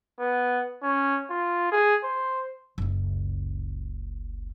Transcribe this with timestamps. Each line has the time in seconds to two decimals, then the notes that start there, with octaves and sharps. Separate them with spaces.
0.20 B3
0.83 C#4
1.30 F4
1.72 G#4
2.04 C5
2.78 F#1 C#2